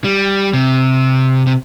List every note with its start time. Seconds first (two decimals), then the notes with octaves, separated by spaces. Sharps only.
0.04 G3
0.53 C3
1.47 C3